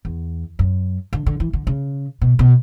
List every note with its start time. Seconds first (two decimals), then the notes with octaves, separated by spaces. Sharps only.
0.05 E2
0.59 F#2
1.13 D3
1.26 D3
1.40 E3
1.53 D3
1.67 C#3
2.22 B2
2.39 B2